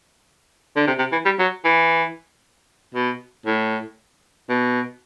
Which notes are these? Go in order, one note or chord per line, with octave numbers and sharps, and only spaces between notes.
D3
C3
C3
E3
G3
F#3
E3
B2
A2
B2